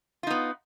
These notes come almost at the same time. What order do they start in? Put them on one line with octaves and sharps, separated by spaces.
F4 D#4 B3